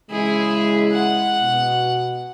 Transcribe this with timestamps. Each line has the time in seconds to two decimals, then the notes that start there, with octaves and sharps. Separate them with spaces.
0.11 C#3 E3 G#3 E4 G#4
0.92 F#5
1.41 B2